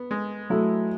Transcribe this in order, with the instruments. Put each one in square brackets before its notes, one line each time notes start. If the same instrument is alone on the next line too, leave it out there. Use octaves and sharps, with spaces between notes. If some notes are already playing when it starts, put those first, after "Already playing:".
Already playing: [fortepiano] B3
G#3
[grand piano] F#3 A3 [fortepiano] E4